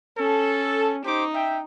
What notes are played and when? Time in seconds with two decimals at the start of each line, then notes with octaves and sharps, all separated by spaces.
0.18 C#4 A4
1.05 D#4 G4 C5 D6
1.35 E5 G5